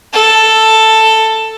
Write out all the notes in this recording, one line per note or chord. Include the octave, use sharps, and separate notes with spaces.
A4